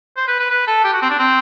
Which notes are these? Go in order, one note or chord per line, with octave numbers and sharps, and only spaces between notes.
C5
B4
B4
B4
A4
G4
F#4
C4
D4
C4